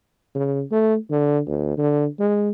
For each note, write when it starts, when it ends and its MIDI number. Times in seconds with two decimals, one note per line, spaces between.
0.35 0.63 49
0.71 0.97 57
1.11 1.40 50
1.47 1.73 38
1.78 2.07 50
2.20 2.52 56